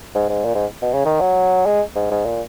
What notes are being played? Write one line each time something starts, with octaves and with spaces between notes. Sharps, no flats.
G#2
G#2
A#2
G#2
B2
C#3
D#3
F#3
G#3
G#2
G#2
A#2